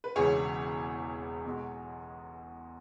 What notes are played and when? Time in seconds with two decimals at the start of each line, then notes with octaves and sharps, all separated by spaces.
0.04 B4
0.16 E1 E2 C#3 G#4 C#5
1.45 B1 B2 G#3